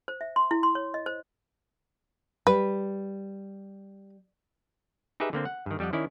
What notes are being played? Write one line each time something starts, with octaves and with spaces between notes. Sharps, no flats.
C5
E5
C6
E4
C6
C#5
D#5
C5
G3 B4
D#4 G4 G#4 B4 E5
D3 A#3 C4
F#5
G2 D#3
F2 G3 G4 D#5 F#5
D#3 C#4 E4 D5